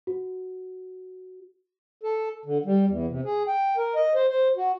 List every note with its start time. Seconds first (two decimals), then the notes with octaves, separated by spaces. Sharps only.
0.07 F#4
2.03 A4
2.45 D3
2.65 G3
2.88 E2
3.08 C3
3.25 G#4
3.47 G5
3.77 A#4
3.95 D#5
4.15 C5
4.29 C5
4.57 F#4